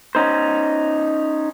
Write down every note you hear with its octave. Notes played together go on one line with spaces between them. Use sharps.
C#4 D#4 C5